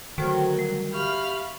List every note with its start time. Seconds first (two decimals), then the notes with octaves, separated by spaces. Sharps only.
0.18 D2 D#3 F#3 F#4 A4 C5
0.59 G3
0.93 G4 E5 F5 B5 C#6 F6